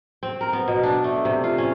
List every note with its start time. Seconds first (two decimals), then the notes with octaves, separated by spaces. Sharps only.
0.23 C4
0.41 A#4
0.53 B3
0.68 B2
0.83 D4
1.04 A3
1.25 C3
1.44 F4
1.58 C#4